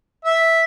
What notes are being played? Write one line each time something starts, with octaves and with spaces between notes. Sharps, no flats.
E5